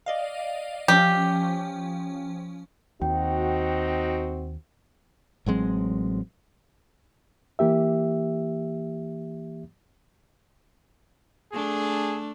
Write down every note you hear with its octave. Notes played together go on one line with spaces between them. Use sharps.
D5 D#5 F5
F3 C#4 G4
D#2 C4 D#4 F#4 G5
A1 F#3 G#3 C4
E3 A#3 G4 E5
A3 D4 G#4